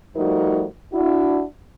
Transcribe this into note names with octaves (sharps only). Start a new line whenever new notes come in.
F3 G3 A3 D#4 F#4 A#4
D4 E4 F#4